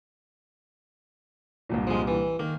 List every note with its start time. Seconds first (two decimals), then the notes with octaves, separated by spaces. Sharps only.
1.69 C2 G2 A#2
1.87 F3 G#3
2.08 E3
2.39 D#3 A#3